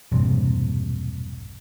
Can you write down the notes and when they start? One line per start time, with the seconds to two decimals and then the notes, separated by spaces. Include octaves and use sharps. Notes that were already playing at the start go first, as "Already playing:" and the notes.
0.12 E1 A#1 G2 C3